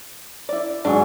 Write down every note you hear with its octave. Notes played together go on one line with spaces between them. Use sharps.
E4 D5
G#2 F#3 D4 G#5